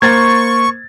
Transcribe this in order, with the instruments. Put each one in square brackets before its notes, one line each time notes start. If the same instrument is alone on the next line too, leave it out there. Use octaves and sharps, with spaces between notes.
[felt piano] A#3 C5 A6 [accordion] C#6 [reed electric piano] G#6